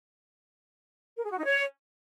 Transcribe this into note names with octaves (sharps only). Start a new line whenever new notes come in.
A#4
G#4
F#4
D#4
C#5